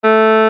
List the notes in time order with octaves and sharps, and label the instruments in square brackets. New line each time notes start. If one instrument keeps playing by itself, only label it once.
[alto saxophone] A3